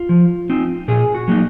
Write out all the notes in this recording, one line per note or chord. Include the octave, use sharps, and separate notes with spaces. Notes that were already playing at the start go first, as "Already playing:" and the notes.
Already playing: F4
F3
C4 D#4
A#2 G#4
F#4
F#3 A#3 D#4